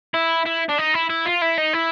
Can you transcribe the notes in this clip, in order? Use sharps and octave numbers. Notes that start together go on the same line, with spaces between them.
E4
E4
D4
D#4
E4
E4
F4
E4
D#4
E4